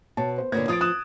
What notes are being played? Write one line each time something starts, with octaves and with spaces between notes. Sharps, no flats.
B2 C#5 A5
C5
A#2 D3 A#3 B3 C#5 G#6
F3 F4 D#6 A6 D7
D#6 F#6 E7